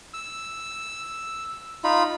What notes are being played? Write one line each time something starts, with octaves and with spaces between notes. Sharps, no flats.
E6
D#4 F4 B5